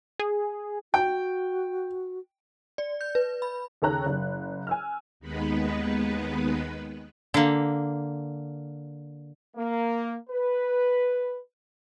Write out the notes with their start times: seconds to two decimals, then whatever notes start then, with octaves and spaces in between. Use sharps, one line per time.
0.19 G#4
0.94 F#4 G5
2.78 D5
3.01 G6
3.15 B4
3.42 B5
3.82 D#2 C#3 A4 C#5 A#5 F#6
4.06 F#1
4.67 G#5 E6 F6
5.20 D#2 D#3 G#3 B3 B4
7.34 D3 A#3
9.57 A#3
10.30 B4